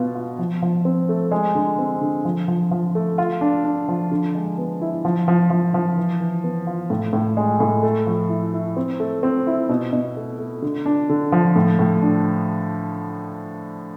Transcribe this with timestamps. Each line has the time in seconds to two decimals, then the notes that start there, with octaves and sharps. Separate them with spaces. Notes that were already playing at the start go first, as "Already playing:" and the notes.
Already playing: B2 B3 F4
0.15 F4
0.39 F3
0.62 F3
0.85 C4
1.09 A3
1.31 G#3
1.55 D3
1.79 C4
2.01 D3
2.25 F3
2.48 F3
2.71 F3
2.95 A3
3.18 F4
3.41 D4
3.65 D4
3.88 F3
4.12 D3
4.35 G#3
4.58 B3
4.81 E4
5.05 F3
5.28 F3
5.50 F3
5.74 F3
5.97 E3
6.20 E3
6.44 B3
6.67 F4
6.90 A2
7.13 A2
7.37 G#3
7.60 A2
7.83 A3
8.07 F3
8.29 E4
8.54 E4
8.77 C4
9.00 A3
9.23 C4
9.47 E4
9.69 B2
9.93 B2
10.17 A3
10.39 A3
10.62 D3
10.86 D4
11.10 D3
11.32 F3
11.56 A2
11.79 A2
12.02 D4